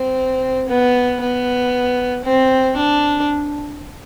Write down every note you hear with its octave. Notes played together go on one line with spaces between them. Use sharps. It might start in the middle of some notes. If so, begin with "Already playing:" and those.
Already playing: C4
B3
B3
C4
D4